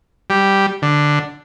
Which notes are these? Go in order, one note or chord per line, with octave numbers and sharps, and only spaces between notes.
G3
D3